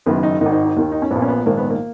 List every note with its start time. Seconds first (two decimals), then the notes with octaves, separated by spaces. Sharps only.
0.06 F#1 F#2 D#3 B3
0.23 D#4
0.41 G#1 G#2 D#3 D#4
0.52 D#4
0.65 D#4
0.77 D#2 D#3
0.92 D#4
1.02 C#4
1.11 A#1 A#2 B3
1.22 C#4
1.28 B3
1.46 A#1 G#2 D#3 A#3
1.58 B3
1.70 A#3